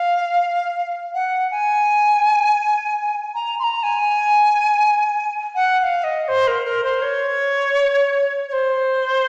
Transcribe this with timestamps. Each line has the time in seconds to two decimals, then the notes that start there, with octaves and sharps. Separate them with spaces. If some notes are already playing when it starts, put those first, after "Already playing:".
Already playing: F5
1.14 F#5
1.51 G#5
3.35 A#5
3.59 C6
3.64 A#5
3.83 G#5
5.55 F#5
5.80 F#5
5.83 F5
6.04 D#5
6.28 C5
6.48 A#4
6.65 A#4
6.84 C5
7.02 C#5
8.49 C#5
8.53 C5